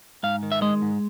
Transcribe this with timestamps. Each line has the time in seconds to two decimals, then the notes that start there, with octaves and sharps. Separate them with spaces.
0.23 G#2 F5
0.43 D#3
0.52 E5
0.62 G#3 D#5
0.82 G#2